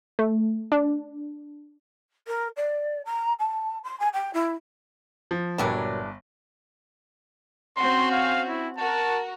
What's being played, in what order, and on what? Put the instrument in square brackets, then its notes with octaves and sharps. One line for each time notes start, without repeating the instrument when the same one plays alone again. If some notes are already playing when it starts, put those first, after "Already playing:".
[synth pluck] A3
D4
[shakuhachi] A#4
D5
A#5
A5
C6
G#5
G5
E4
[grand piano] F3
[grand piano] G1 A5 [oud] A#2 F#3 A#4 [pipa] E3 G3 D4
[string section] C4 C#4 F#4 [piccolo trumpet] C6
[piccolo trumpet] F5
E4
[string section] F#4 A#4 [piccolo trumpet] A5